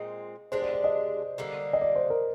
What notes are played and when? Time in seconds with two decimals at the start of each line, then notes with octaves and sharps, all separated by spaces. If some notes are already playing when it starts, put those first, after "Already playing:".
Already playing: A#2 G#3 C4 D#4
0.52 G#3 D4 G4 C5
0.62 D5
0.73 D5
0.84 D#5
1.38 D3 G3 A#3
1.73 D#5
1.81 D5
1.96 C5
2.10 A#4